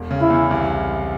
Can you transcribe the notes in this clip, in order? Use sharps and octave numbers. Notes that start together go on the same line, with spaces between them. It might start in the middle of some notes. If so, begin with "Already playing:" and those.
Already playing: E1
C#3
E4
E2
C2